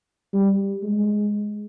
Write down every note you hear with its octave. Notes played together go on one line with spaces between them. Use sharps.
G3
G#3